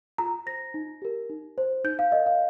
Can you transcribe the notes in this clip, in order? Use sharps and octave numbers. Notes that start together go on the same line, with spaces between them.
F4 A#5
C5 A#6
D#4
G4 A#4
D#4
C5
D#4 G6
F5
A#4 D#5
F5